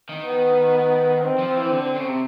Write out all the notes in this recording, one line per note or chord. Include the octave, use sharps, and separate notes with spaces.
D#3
B3
C4
F3
E3
D3
C#3
C3